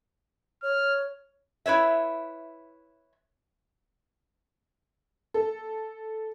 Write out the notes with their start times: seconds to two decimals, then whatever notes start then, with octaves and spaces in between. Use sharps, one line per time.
0.63 C#5 F6
1.66 E4 B4 C#5 E5
5.34 A4